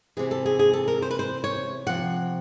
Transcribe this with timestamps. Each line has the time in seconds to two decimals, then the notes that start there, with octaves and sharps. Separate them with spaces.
0.17 C3 E3 G#4
0.31 A4
0.46 G#4
0.59 G#4
0.73 A4
0.88 A#4
1.02 C5
1.11 B4
1.19 C5
1.44 C#5
1.86 C3 F3 F#5